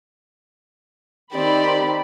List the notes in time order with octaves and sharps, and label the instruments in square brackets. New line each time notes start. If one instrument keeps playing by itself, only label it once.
[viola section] D#3 C4 B5 [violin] G4 D5